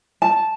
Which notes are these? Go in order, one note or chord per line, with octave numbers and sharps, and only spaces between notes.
A5